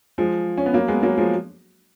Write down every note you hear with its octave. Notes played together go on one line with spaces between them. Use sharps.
F3 G#3
C#4
B3
F#3 A#3
G#3 B3
F#3 A#3
F3 G#3